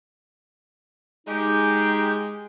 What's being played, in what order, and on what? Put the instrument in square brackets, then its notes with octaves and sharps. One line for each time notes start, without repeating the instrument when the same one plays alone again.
[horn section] G#3 [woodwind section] D#4 G4